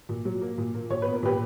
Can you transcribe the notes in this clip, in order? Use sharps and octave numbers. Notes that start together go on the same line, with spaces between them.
A#2
F#3
A#3
A#2
A#3
A#2 C#5
B3 B4
A#4
A#2 G4 B4